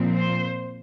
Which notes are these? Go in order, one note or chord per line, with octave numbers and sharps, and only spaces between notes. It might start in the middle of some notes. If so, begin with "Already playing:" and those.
Already playing: A#2 F3 C4
C5